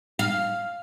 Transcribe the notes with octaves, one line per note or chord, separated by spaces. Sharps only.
F5